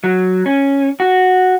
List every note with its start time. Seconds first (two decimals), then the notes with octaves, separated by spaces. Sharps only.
0.04 F#3
0.46 C#4
1.00 F#4